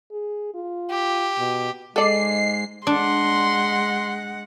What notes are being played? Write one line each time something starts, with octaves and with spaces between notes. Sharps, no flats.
G#4
F4
G4
B2
G#2 G#3 A4 D5 D#5 C7
G#3 D4 F#5 C6